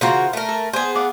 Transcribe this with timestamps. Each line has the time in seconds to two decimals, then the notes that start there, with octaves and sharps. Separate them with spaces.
0.01 C#3 E3 F4 F#4 A#4 C5
0.33 A3 A#4
0.49 A4
0.73 B3 G#4 C5 G#5
0.95 D5 F5 F#5